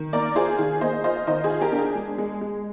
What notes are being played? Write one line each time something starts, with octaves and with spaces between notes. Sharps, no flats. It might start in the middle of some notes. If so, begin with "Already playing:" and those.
Already playing: D#3
A#3 A#4 D5
F4 G#4 C5
D#3 G#4
A#3 C5 D#5
F4 C5 D#5
D#3 C5 D#5
G#4 C5
F4
G4 A#4
D4 A#4
G#4
G#3
G#3
G#3